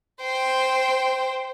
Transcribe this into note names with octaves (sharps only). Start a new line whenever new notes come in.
C5 G5